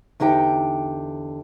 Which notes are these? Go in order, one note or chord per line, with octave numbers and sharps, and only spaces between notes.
E2 D3 D#4 G4 G5